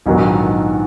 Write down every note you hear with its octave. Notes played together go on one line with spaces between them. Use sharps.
A#1 G#2 D#3 F#3 B3